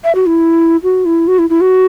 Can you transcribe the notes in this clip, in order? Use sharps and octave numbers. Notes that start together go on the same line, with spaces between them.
E5
F#4
E4
F#4
E4
F#4
E4
E4
F#4